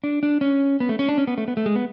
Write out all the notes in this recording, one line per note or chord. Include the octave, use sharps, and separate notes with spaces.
D4
D4
C#4
B3
A3
C#4
D4
C#4
B3
A3
B3
A3
G#3
B3